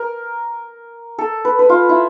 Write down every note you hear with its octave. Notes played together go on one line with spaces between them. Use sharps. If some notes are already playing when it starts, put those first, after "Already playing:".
Already playing: A#4
A4
B4
B4
F4
E4